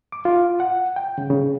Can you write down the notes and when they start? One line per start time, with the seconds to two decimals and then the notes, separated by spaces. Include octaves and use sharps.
0.12 D6
0.25 F4
0.60 F#5
0.96 G5
1.18 C#3
1.30 C#3